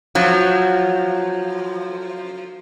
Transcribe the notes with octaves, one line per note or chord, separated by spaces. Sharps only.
F3 F#3